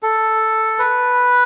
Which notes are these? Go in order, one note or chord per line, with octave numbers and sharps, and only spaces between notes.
A4
B4